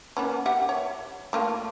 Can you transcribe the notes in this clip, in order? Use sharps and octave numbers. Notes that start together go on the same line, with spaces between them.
A#3 B3 C#4
G4 E5 F#5
C#5
A3 A#3 F4